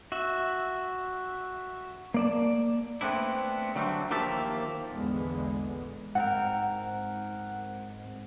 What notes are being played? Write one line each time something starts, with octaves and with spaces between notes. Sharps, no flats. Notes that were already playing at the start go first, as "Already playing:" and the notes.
F#4 E5
A#3 D5 A5
A3 B3 C4 D4 E4
D3 F#3 G3 A3 C4
D#2 F3 A#3 G4 E5 A5
A#1 E2 D3 E3 G#3 B3
G#2 C4 A#4 F#5